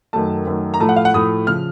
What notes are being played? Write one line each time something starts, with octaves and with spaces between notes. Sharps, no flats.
F#2 D#3 F#3 A3 A5
F#2 D#3 F#3 A3
A#5
A2 F3 A3 A5
F#5
F5
F#5
A2 F3 A3 D#6
C#3 F3 F6